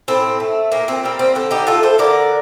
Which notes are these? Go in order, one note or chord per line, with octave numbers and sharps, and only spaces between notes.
A2 C4
A3
A#2 A#3
C4
G3 A#3 C4
C4
D3 C4
D#4 G4
A3 F4 A4
A4 C5
D3 A#4 D5